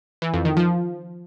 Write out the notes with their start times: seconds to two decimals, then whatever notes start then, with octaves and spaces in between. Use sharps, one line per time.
0.22 E3
0.34 F2
0.45 D#3
0.57 F3